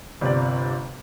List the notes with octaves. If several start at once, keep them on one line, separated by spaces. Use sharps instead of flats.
G1 C3 D5